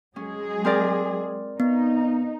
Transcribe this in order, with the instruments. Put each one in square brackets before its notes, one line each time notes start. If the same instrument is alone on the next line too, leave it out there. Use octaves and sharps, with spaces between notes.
[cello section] F#3 G#3 G#4 [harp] C#4
[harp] C4 A#4 D5
[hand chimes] B3 [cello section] D#4